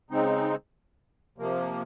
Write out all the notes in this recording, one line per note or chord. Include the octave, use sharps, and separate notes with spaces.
C#3 G#3 C4 D#4
C3 F3 A#3